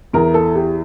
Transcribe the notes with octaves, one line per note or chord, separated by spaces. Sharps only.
E2 E3 A#4
A4
G4